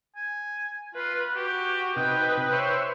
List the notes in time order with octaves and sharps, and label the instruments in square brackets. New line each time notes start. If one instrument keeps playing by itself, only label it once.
[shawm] G#5
[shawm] F4 [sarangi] B4
[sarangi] F#4 [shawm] G4
[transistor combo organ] C3 D#4 [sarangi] B4 [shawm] G5
[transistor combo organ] C5 C#5 E5